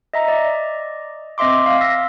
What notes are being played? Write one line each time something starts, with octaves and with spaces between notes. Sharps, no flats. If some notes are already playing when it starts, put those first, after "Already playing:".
D#5 E5 A#5
D5 D#5
C4 D#5 E5 C6 D6
F5
E6 A#6 B6